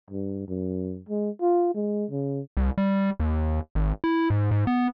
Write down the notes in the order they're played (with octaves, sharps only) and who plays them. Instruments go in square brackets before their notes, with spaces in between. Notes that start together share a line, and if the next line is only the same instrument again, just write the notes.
[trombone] G2
F#2
G#3
F4
G#3
C#3
[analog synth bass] C2
G3
D#2
G#1
E4
G#2
G#2
B3